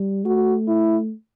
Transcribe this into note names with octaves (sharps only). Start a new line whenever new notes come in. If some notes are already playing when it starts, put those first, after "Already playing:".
Already playing: G3
A3 F#4
E4